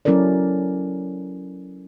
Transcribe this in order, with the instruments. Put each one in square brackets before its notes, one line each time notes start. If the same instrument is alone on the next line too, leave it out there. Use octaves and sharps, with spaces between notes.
[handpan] F#3 C#4 E4 A4 A#4 D5